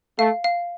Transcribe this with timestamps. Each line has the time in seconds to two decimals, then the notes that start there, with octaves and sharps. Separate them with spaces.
0.18 A3 F5
0.44 F5